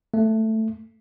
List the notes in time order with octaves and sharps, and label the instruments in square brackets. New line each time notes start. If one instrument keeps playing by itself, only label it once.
[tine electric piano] A3